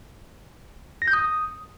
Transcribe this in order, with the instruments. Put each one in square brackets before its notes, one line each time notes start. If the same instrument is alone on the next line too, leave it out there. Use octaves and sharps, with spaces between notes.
[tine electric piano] A#6
G6
D#6